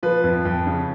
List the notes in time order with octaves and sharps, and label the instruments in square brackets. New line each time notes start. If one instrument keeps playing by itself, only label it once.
[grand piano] F3 B4
F2
F2
C#3